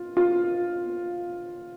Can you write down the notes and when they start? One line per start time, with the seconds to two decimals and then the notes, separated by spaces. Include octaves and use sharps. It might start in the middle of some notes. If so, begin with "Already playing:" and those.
Already playing: F4
0.17 F4